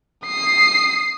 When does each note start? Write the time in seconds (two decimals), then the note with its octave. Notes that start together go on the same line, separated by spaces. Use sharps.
0.25 D#6 C7